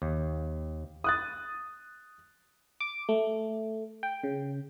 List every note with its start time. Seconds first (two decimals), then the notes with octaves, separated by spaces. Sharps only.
0.02 D#2
1.04 D#6 F#6 A6
2.80 D6
3.09 A3
4.03 G5
4.24 C#3